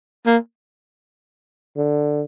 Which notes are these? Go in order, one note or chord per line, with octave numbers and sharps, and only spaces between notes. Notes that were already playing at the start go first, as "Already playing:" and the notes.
A#3
D3